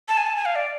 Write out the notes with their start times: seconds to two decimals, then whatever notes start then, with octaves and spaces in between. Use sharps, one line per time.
0.08 A5
0.17 G#5
0.26 A5
0.36 G#5
0.45 F5
0.55 D5